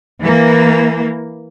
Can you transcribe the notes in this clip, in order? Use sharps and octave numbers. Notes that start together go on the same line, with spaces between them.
E3 A#3